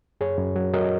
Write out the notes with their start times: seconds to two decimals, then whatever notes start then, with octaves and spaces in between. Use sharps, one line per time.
0.21 F#2 G#4 C#5
0.38 F#2
0.56 F#3
0.74 F#3 A#4 D#5